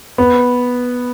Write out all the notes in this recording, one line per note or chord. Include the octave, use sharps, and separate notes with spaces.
B3